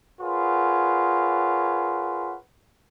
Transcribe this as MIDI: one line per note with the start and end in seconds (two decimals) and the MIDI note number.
0.20 2.36 65
0.20 2.36 68
0.20 2.36 70
0.20 2.36 71
0.20 2.36 73
0.20 2.36 78